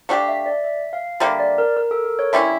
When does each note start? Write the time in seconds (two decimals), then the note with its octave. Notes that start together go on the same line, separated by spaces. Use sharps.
0.09 A3 D4 G4 F5
0.28 E5
0.46 D5
0.64 E5
0.93 F5
1.20 D3 G3 A#3 E5
1.39 D5
1.58 A#4
1.77 A#4
1.91 A4
2.04 A#4
2.19 C#5
2.33 D3 G3 C#4 E4 E5